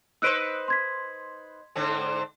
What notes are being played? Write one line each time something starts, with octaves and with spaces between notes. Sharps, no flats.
D#4 B4 C5 E6 F#6 D7
C6 G#6 B6
G#2 D3 C4